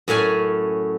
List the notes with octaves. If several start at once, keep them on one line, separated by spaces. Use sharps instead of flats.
F#2 A2 C#4 G#5